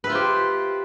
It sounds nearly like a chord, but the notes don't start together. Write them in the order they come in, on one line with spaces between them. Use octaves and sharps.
B4 E5 F4 C5 G4